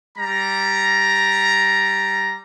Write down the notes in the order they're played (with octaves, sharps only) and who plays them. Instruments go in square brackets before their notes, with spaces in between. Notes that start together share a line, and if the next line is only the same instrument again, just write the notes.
[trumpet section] G3 A#5